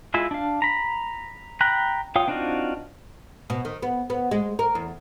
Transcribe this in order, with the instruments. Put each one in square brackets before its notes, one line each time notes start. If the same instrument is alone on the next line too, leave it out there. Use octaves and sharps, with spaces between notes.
[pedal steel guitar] G#3 E4 F4 E6
D4 F5
A#5 B5
G5 A#5 B5 F#6
F4 C#5 F5 G5 D#6
C4 D4 D#4 F4 F#4
[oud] B2
D#3
B3
B3
G#3
A#4
E2